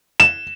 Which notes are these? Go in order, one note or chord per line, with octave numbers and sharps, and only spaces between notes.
E7